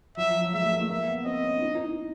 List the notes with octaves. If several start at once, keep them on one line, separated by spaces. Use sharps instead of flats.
F#3 E5
F3
F#3
G#3 E5
A3
A#3
A3
A#3 E5
B3
C4 D#5
C#4
D4
D#4
D#4
E4